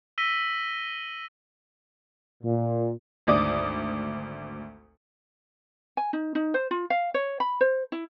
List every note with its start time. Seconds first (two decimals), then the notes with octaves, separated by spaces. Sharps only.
0.18 E6 A#6 B6 D#7 G7
2.43 A#2
3.27 G#1 D2 D5 D6 D#6
5.97 G#5
6.13 D#4
6.35 D#4
6.54 C5
6.71 F4
6.90 F5
7.14 C#5
7.40 B5
7.61 C5
7.92 E4